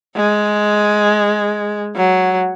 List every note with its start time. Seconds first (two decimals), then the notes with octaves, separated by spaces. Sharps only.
0.16 G#3
1.96 F#3